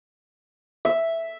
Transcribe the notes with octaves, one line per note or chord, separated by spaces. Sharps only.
E5